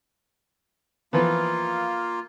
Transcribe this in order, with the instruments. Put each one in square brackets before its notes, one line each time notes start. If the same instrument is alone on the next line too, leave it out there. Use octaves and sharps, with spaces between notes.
[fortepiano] E3 F3 B3 [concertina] A#3 F4